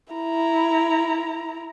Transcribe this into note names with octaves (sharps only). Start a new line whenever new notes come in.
E4 A#5